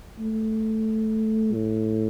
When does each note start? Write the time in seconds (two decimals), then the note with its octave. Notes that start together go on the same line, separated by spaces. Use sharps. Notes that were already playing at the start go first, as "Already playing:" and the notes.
0.19 A3
1.54 A2